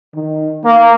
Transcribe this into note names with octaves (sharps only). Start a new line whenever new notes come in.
D#3
A#3